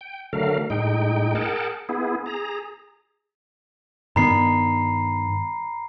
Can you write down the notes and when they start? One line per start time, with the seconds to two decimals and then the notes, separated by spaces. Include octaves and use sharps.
0.01 G5
0.33 D3 F#3 A3 A#4 F5
0.70 A2 G#3 D#4 G5
1.35 G#4 A#4 F#5 G5 A5
1.89 B3 E4 G#4
2.26 G#4 A#5
4.16 G2 D#3 B3 A#5 B5 C7